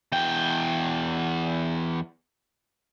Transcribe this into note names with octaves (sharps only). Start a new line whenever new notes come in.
E2 G5